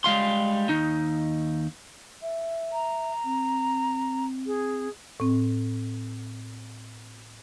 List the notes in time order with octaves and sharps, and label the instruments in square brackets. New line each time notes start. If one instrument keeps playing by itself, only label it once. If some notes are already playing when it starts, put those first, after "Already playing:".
[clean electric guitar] G3 G#3 F5 C6
D#2 D#4
[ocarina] E5
[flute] A#5
[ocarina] C4
[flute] G#4
[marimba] A2 C4